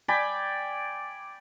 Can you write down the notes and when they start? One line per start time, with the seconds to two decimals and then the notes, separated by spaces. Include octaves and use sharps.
0.08 D5 G5 G#5 B5